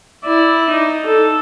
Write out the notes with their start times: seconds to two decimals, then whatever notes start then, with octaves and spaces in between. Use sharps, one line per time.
0.25 E4 D5
0.71 D#4
1.06 A4